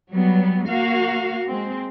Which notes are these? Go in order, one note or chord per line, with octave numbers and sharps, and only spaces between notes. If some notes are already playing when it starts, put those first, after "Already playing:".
F#3 G3 B3
A#3 F#4 F5
G#3 C4